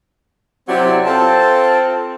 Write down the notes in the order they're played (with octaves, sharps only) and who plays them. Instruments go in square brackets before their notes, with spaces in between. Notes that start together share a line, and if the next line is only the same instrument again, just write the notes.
[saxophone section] C3 F#3 E4 [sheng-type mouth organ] C4 G4 D5
[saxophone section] C4 [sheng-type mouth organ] F4 A4 A5